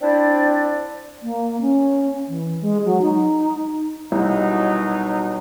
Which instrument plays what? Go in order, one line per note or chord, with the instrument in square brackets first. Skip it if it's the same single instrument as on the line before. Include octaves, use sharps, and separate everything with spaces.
[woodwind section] C4 D4 E4 C5 D5
[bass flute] A#3
C#4
E3
G#3
F#3
D#4
[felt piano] C2 [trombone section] B2 F#3 D#4